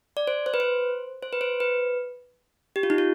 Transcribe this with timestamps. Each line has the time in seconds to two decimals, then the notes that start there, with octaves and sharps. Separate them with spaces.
0.17 D5
0.27 C5
0.46 C5
0.54 B4
0.60 C5
1.23 C5
1.33 B4
1.41 C5
1.60 B4
2.76 G4
2.83 F4
2.90 D#4
2.98 F4